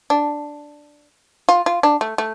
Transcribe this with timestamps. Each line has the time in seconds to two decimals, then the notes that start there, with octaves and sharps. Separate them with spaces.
0.10 D4
1.49 F4
1.66 F4
1.83 D4
2.01 A3
2.18 A3